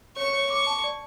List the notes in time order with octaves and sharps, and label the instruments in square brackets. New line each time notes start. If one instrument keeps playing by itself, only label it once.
[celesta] C#5 [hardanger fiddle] C#6
[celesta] C#5
[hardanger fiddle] C#6 [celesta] D6
[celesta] A5
D5